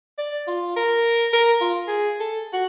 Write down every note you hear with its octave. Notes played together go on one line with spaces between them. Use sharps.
D5
F4
A#4
A#4
F4
G#4
A4
F#4